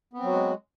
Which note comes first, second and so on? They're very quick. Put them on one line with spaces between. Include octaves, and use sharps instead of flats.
B3 C4 F#3 F#4 G#3